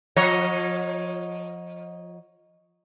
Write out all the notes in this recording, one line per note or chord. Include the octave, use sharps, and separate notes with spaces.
F3 C#5 D#5